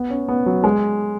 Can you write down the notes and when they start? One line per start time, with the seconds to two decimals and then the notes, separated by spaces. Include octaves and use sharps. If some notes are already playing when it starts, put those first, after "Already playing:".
Already playing: B3
0.10 C#4
0.28 B3
0.46 F#3
0.64 G#3